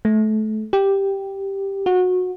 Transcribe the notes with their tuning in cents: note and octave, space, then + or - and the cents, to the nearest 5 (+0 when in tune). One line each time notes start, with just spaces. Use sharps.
A3 -25
G4 +0
F#4 -20